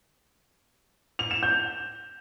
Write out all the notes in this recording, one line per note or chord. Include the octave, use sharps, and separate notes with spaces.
F7
E7
G6